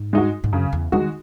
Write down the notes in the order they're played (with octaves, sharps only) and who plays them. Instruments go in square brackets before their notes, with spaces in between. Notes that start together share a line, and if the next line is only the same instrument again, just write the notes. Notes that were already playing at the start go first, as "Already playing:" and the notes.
Already playing: [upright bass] G#2
[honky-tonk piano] G#3 D#4 F#4
[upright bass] G#2
[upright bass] F#2 [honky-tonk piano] C#3
[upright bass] E2
[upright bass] D#3 [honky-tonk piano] G#3 D#4 F#4